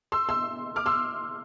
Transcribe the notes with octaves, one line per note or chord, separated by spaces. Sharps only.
C6 E6
C6 E6
D6 F6
C6 E6